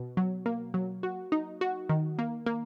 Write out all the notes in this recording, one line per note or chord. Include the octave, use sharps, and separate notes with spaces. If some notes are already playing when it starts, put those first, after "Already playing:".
Already playing: B2
F#3
A#3
F#3
F#4
D#4
F#4
D#3
A#3
A#3